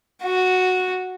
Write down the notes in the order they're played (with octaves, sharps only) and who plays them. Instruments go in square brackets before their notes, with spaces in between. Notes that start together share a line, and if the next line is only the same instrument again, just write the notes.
[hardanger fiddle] F#4